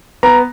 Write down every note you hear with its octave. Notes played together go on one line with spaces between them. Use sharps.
B3 A#5